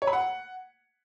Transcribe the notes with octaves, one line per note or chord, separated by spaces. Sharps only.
C#5
B5
F#5